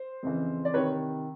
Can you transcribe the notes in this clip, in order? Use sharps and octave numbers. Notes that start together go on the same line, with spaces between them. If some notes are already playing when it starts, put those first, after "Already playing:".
Already playing: C5
F2 C#3 E3
D5
C3 D#3 B4 C#5